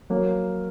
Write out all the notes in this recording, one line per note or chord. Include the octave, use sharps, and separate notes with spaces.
F#3 A#3